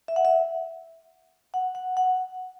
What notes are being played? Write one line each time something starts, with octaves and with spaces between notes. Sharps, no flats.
E5
F#5
E5
F#5
F#5
F#5